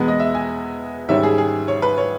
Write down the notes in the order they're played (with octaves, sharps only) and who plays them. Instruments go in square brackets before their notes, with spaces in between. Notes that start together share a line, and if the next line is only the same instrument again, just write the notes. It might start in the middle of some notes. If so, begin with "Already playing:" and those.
Already playing: [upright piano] E2 B2 G#3 B3
D#5
E5
G#5
G#2 D#3 G3 C#4 E5
G#4
G#4
C#5
B4
C#5